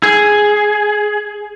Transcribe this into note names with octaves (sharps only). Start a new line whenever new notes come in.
G#4